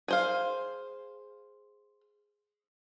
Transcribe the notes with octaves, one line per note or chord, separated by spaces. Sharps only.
G#4 C5 F5